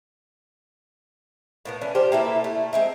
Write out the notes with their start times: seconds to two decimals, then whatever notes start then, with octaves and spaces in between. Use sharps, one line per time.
1.65 A2 A#3 B3
1.81 E3 C#4 D4
1.95 D4 F4 G4 C5
2.12 A#3 E4 A4 B4
2.44 A3
2.73 G#3 C4 E5